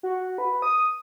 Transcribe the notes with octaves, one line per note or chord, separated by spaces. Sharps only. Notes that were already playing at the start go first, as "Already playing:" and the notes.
F#4
B4
D#6